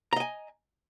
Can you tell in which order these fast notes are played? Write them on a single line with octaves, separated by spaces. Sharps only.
A#5 D#5 G#5